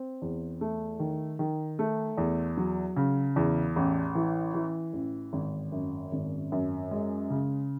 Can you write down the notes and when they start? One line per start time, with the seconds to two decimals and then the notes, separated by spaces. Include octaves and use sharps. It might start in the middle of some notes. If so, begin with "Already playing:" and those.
Already playing: C4
0.22 E2
0.61 A3
0.99 D#3
1.39 D#3
1.79 A3
2.17 E2
2.57 F#3
2.96 C#3
3.36 E2
3.76 A1
4.15 E3
4.54 E3
4.93 A1
5.33 G#1
5.72 F#2
6.12 G#1
6.52 F#2
6.91 G#3
7.30 C#3